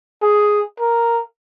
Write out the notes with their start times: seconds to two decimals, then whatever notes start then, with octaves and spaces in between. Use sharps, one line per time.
0.22 G#4
0.80 A#4